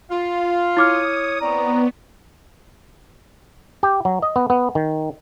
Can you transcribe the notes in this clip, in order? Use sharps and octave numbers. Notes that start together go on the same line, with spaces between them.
F4
E4 C#5 D6 D#6 F6
B3 C4 C#5 D5 A#5
G4
F#3
D#5
B3
B3
D#3